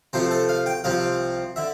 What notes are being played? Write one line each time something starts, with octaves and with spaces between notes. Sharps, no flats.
C3 F3 A3 C5
A4
F5
G5
C2 C3 F3 C4 F5
D3 E5